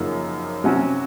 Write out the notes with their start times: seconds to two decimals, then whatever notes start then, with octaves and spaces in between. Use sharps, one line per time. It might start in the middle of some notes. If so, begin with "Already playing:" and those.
Already playing: F#2 C#3 F3 A#3 D#4
0.64 C3 F#3 C#4 F#4